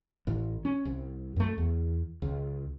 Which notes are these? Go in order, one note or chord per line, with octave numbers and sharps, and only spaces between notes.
A1 A2
C#4
C2
F#2 A3
E2
C#2